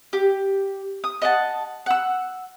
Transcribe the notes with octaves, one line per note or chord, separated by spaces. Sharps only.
G4
D#6
D#5 F#5 A5
F#5 E6